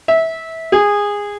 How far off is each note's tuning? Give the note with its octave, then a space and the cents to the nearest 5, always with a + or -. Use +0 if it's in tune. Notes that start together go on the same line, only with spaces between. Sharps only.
E5 -20
G#4 -20